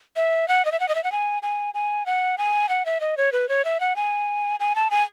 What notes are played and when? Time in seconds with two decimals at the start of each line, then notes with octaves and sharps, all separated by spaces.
0.16 E5
0.48 F#5
0.65 D#5
0.72 E5
0.80 F#5
0.88 D#5
0.95 E5
1.04 F#5
1.12 G#5
1.43 G#5
1.74 G#5
2.06 F#5
2.38 G#5
2.69 F#5
2.86 E5
3.01 D#5
3.17 C#5
3.32 B4
3.49 C#5
3.65 E5
3.80 F#5
3.96 G#5
4.60 G#5
4.76 A5
4.91 G#5